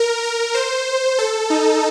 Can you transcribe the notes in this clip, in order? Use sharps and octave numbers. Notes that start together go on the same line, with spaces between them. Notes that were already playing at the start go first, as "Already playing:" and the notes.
Already playing: A#4
A#4
C5
A4
D#4